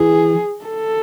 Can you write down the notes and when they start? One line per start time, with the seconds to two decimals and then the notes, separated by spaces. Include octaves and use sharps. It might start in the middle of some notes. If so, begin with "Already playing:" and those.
Already playing: E3 G#4
0.65 A4